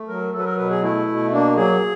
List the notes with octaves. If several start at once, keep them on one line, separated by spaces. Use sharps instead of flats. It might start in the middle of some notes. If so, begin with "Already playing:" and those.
Already playing: A3
F#3 A#4
F#3 A4
B4
A#4
B2 B4
G#4
A3 E4
B2
A#3 D4
F#3 G#4